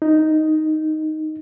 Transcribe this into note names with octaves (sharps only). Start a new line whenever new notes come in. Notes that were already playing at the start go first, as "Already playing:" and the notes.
D#4